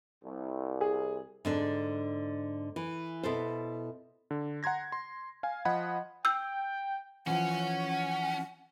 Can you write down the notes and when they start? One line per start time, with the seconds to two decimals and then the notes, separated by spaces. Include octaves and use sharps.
0.23 C2
0.81 G#4
1.45 G#2 D3 D4
2.76 E3
3.23 B2 E4 A4 C5
4.31 D3
4.63 F#5 A#5 C6 G#6 A#6
4.92 C6
5.43 F5 G#5
5.65 F3 D#5 F#5 B5 G#6
6.25 G5 E6 G6
7.27 E3 F3 C#4 F#5